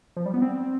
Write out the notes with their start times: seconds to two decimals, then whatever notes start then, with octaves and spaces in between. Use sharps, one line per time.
0.16 F3
0.26 G3
0.34 B3
0.42 C4